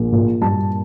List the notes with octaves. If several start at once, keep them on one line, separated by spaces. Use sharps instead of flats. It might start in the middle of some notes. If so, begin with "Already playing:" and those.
Already playing: A#1 A#3
A#2
G2 A5